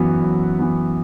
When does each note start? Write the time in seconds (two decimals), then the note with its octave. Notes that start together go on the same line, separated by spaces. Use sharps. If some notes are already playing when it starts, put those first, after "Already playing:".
Already playing: F#2 E3 B3 F#4
0.22 F#2
0.59 E3 B3